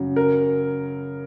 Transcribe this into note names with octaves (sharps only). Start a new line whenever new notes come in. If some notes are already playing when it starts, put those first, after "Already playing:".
Already playing: F#2 C#3 F#3
A#4